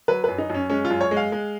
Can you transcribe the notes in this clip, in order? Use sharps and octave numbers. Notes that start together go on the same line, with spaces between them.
F#3 B4
F#2 B4
D#4
F#2 C#4
G#3 C#4
F4
F#2
C#5
G#3
F5
G#3